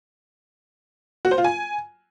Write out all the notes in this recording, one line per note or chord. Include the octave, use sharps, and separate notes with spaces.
F#4
C5
F4
G#5